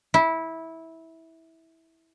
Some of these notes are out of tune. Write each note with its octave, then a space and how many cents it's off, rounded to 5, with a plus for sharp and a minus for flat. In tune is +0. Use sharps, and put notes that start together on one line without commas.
E4 -15